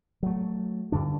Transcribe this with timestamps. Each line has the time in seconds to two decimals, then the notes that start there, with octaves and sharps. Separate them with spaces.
0.23 F#3 A3
0.92 G2 D3 D4